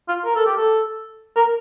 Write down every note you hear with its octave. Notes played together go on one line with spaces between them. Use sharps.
F4
A#4
A4
G4
A4
A#4